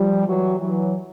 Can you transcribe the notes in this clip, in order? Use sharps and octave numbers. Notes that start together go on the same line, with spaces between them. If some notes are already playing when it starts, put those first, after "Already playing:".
Already playing: F3 G3
E3 F#3
E3 F#3